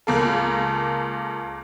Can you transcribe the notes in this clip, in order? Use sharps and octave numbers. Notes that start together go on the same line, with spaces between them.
C#2 A#3 A4